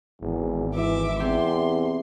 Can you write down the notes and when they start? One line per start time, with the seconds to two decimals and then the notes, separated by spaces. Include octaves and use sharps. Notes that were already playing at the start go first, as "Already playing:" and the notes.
0.22 G#1 E2
0.75 E3 E5 D6
1.20 E2 C3 C6